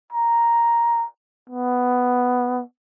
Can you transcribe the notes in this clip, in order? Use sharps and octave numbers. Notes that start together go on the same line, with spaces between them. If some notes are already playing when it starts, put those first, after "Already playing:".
A#5
B3